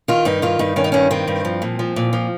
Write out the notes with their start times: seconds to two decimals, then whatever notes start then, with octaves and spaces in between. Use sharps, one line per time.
0.08 D#3 F4
0.25 G2 D#4
0.42 D#3 F4
0.59 G2 D#4
0.76 D#3 C#4
0.84 D#4
0.92 G2 C#4
1.11 D#3 C4
1.27 G2
1.45 F3
1.62 A#2
1.79 F3
1.96 A#2
2.13 F3